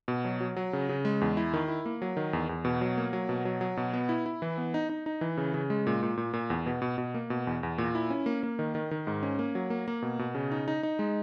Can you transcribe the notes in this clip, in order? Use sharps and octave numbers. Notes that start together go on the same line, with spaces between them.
B2
F#3
F#3
F#3
C#3
C#3
G#3
E2
E4
D#3
E4
A#3
F#3
D#3
E2
E2
B2
F#3
A#3
F#3
B2
F#3
F#3
B2
B3
E4
E4
E3
B3
D#4
D#4
D#4
E3
C#3
C#3
G#3
A#2
A#2
A#2
A#2
E2
B2
B2
B2
A#3
B2
E2
E2
A#2
E4
C#4
A#3
A#3
D#3
D#3
D#3
G#2
C#4
A#3
F#3
A#3
A#3
B2
B2
C#3
D#4
D#4
D#4
G#3